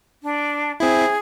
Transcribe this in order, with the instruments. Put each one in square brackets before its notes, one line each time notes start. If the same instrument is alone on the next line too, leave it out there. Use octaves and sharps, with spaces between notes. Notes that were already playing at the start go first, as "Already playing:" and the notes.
[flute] D4
[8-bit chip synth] C4 E4 [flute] G#4